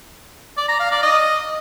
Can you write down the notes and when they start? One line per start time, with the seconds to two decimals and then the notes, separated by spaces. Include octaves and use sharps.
0.57 D5
0.69 A#5
0.80 F5
0.91 D5
1.03 D#5